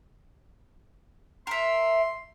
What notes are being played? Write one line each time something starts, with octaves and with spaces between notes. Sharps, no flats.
A#4 E5 C6